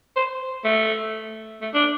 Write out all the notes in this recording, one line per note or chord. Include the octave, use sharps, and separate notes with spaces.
C5
A3
A3
D4